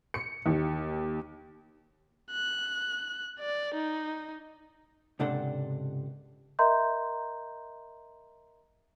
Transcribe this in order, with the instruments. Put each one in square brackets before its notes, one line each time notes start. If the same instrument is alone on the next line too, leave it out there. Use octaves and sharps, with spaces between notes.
[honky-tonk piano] C#7
D#2
[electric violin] F#6
D5
D#4
[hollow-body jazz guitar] C#2 G#2 C3 D4 A4 F#5
[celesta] A#4 D#5 E5 A#5 C6 G6